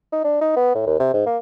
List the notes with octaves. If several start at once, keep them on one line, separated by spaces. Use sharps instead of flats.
D#4
D4
D#4
B3
A2
D#2
C3
G#2
A#3